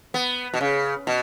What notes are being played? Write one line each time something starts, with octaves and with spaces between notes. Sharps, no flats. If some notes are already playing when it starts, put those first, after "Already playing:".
B3
B2
C#3
B2